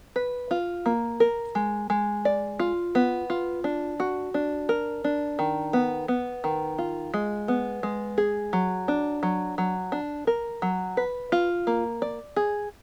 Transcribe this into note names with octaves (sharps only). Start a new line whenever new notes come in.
B4
F4
A#3
A#4
G#3
G#3
D5
F4
B3
F4
D4
F#4
D4
A#4
D4
D#3
B3
B3
D#3
F4
G#3
B3
G#3
G#4
F#3
D4
F#3
F#3
D4
A#4
F#3
B4
F4
A#3
D5
G#4